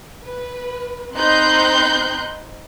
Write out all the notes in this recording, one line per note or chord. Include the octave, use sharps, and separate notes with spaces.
B4
C4 D#4 B5 C6 F#6 G6